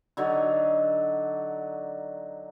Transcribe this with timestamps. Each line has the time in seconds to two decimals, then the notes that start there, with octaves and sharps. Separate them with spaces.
0.17 D3 F#3 D#4